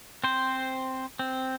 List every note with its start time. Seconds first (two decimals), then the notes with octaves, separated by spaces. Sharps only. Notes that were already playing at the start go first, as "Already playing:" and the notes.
0.24 C4 C5
1.19 C4